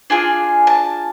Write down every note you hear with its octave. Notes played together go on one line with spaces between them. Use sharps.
D4 F4 G#4 G#5
A5